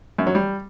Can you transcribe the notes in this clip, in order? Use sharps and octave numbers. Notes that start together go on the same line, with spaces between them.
F#2
F#3
G3